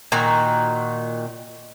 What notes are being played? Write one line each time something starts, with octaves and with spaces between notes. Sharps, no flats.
A#2 D#3 F#4 A#5